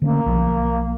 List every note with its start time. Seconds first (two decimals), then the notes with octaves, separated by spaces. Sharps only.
0.02 D3 A3 A#3 C#4
0.26 B1 F3